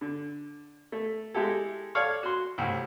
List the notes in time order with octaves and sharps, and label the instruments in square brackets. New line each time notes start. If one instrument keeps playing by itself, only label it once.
[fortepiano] D3
A3
G#3 E4 G4 A4
A4 C#5 D5 F5
F#4 C6
C2 A2